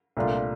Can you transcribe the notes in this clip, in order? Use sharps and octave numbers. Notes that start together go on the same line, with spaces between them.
C2 A#2 A3 D4 F4